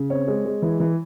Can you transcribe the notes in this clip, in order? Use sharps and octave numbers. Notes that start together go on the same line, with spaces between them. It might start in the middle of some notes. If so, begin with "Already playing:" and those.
Already playing: C#3
C4 C#5
G#3
G#3
E3
E3